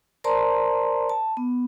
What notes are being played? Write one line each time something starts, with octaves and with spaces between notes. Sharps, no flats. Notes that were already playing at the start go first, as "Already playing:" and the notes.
A#4 C5 D5 A5 A#5 C6
A5
B3